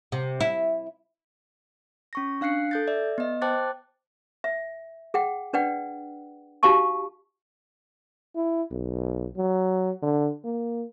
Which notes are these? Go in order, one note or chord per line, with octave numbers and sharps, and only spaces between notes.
C3
E4
C#4 C#6 A#6
D4 F5 F#6 C7 C#7
A4 G6 A6
D5 E5
B3 D#5
C5 G5 A5 D6 F#6 A6
E5
G#4 F#5 G5
D4 B4 D5 F#5 G5
D#4 F#4 G4 F5 A5 C#6
E4
B1
F#3
D3
A#3